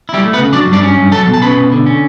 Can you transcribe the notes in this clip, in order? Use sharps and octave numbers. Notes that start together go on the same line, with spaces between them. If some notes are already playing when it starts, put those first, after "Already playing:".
G3 E4 G4
A3
B3 B4
C#3
F#3 D4 D5
G2
D4 D5
C#4
G2
F#3 A4 A5
B2
A5
C#4 B4 B5
B2
D3
C#4